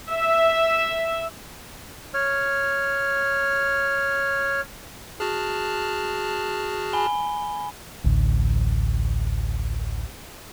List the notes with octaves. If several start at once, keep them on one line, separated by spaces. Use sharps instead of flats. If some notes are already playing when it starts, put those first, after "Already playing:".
E5
C#5 F6
F#4 G#4 A5 F6 F#6
G#5 B5 G7
A1 D2